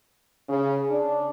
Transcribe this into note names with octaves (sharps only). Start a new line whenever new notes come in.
C#3
D4